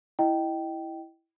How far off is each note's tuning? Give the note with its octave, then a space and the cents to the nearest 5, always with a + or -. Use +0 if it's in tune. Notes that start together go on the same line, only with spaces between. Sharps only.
E4 +0 D#5 +0 G5 -15